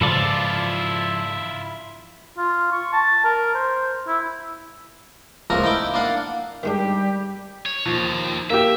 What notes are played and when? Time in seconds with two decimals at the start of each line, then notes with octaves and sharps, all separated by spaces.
0.01 G#2 C#3 E3 F3 E4 F4 A4 D5
2.37 F4
2.72 C#6
2.93 A5
3.24 A#4
3.54 C5
4.07 E4
5.50 C#2 F3 A3 A#3 A#4 A#5
5.64 D#4 E4 G5 D6
5.94 A#3 D4 F5 F#5
6.63 D#3 G3 G#3 D4 G4
7.66 C#5
7.86 D#2 F3
8.50 A#3 G4 E5